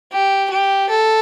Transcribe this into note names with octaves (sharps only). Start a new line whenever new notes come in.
G4
G4
A4